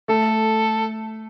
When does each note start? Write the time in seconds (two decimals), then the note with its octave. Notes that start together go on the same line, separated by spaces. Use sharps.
0.08 A3 A4